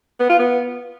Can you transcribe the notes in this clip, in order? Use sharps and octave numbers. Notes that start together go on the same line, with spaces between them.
B3
F4
B3